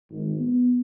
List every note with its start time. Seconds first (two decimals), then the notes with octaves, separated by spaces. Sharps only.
0.11 G#1
0.39 B3